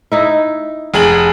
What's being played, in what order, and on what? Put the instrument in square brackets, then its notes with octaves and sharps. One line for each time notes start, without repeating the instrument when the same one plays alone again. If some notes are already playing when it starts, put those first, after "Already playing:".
[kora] D#4 E4
[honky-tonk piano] F1 G#4 F#7